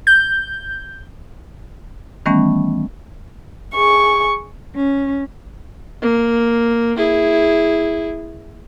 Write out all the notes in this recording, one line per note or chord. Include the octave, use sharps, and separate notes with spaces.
G6
D#3 E3 G3 A3 B3 C#4
G#4 C#6
C#4
A#3
E4 G#4